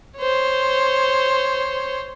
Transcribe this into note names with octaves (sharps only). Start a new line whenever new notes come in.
C5 C#5